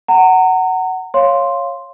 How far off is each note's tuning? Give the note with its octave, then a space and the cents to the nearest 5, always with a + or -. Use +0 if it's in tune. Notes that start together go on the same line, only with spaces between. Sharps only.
F#5 +15 A#5 -30
C#5 -10 F5 +0 C6 +0